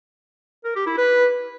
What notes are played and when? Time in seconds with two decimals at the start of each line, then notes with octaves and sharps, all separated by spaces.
0.64 A#4
0.75 G4
0.86 E4
0.98 B4